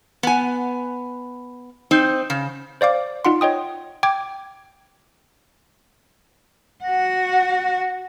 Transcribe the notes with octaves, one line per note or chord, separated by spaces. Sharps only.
B3 G#5
C4 D#4
C#3
C5 D5 F5 D6
D#4 F4 F#5 C6
C#5 D#5 G5 D#6
G5 D6 G#6
F#4 F#5